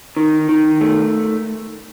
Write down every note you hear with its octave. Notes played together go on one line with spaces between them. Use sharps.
D#3
D#3
A3